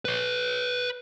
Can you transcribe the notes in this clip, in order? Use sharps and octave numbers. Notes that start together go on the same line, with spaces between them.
B4 C#5